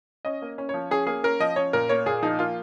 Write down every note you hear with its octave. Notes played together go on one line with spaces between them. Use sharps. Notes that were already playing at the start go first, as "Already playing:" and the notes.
C#4 D#5
A#3
C#4
F3 C#5
C#4 G#4
A#3 G#4
C#4 A#4
F3 D#5
C#4 C#5
A#2 A#4
A#3 C#5
A#2 G#4
F3 D#4
A#3 F4